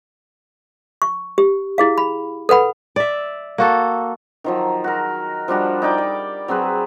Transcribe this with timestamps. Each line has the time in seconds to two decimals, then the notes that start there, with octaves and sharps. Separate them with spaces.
1.02 C#6
1.38 G4
1.78 E4 G#4 F5
1.98 B5
2.49 A4 B4 F#5 B5
2.96 D5 E5
3.58 A#3 F#4 A4
4.44 D#3 F3 F#3
4.84 F#4 A#4
5.48 F3 G3 D4 F#4
5.82 D#4 D5 G5 D6
5.98 D5
6.48 F#3 C4 G#4 B4